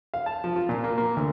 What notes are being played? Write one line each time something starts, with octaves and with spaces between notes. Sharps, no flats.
F5
A5
F3
F4
A#2
A#3
A#3
D2